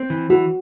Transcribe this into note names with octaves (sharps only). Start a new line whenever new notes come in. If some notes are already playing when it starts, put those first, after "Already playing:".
Already playing: C4
E3
E3 F#4